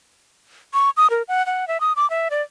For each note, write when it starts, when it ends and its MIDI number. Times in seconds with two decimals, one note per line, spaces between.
0.74 0.90 85
0.97 1.10 87
1.10 1.22 70
1.28 1.45 78
1.46 1.68 78
1.68 1.80 76
1.80 1.93 87
1.96 2.09 86
2.10 2.28 76
2.31 2.42 74